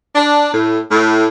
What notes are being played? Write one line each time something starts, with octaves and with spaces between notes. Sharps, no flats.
D4
A2
A2